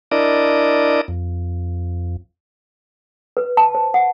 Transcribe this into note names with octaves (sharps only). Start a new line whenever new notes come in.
D4 E4 A#4 D5 D#5
F2
B4
A5
C5
F#5